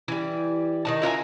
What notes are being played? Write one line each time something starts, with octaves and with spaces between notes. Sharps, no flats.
E3 G3
D#3 D#4 A5
E4 F4 A#4 G#5